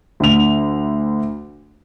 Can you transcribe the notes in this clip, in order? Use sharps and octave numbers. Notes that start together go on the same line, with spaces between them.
D2 D3 F7